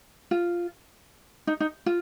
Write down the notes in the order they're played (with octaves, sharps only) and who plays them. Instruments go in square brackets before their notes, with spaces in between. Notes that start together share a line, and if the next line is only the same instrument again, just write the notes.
[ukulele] F4
D#4
D#4
F4